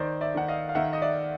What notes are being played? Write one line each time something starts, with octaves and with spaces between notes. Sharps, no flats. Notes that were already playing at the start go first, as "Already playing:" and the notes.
Already playing: D#3 C5 D5
D5 E5
D#3 F#5
D#5 F5
F5
D#3 E5 F#5
D#5
D5 E5